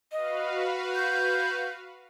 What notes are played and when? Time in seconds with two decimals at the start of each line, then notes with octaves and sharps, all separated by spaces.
0.12 F#4 B4 D#5 F5
0.95 G6